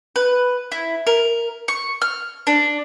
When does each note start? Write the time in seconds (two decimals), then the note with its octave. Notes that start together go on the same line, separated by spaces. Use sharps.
0.16 B4
0.72 E4
1.07 A#4
1.68 C#6
2.02 F6
2.47 D4